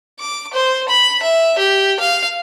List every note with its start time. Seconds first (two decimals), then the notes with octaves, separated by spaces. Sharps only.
0.19 D6
0.53 C5
0.88 B5
1.22 E5
1.58 G4
2.00 F5